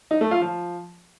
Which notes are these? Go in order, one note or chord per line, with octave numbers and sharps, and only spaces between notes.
D#4
A3
F4
F3